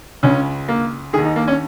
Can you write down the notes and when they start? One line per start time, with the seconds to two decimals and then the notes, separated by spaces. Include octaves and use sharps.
0.23 C#2 C#3 C#4
0.69 A#3
1.13 D#3 G#4
1.18 D#2
1.25 D#4
1.36 A#3
1.48 C#4